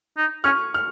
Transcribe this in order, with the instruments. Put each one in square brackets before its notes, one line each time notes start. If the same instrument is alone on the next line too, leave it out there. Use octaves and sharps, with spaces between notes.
[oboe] D#4
[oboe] C#4 [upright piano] C#6 F6
[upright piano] F6